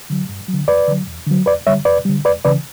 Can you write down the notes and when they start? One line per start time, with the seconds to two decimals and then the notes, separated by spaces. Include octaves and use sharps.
0.10 D3 F#3
0.29 G2
0.48 D3 F#3
0.68 E2 B4 D5
0.88 D3 F#3
1.07 E2
1.27 D3 F#3
1.46 E2 B4 D5
1.67 D3 G3 C#5 E5
1.85 E2 B4 D5
2.05 D3 G3
2.25 E2 B4 D5
2.45 C#3 E3 B4 D5